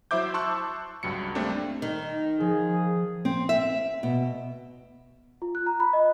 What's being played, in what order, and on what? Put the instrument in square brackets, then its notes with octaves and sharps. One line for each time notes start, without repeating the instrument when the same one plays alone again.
[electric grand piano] F#3 E4 C5 E5 D6 G6
A5 C6 C#6 E6 F#6
C#2 G2 F#3 C#7
G3 A3 A#3 C4 D4
[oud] D#3
[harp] F3 [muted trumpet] G#4
[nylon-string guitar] C4
E5
B2
[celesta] F4
F#6
A#5
B5
D#5